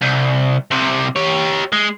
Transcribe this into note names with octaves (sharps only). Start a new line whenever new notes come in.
C2
C2 C3
G4 C#5
G#3